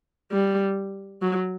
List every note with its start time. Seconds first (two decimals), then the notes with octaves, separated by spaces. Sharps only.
0.32 G3
1.22 F#3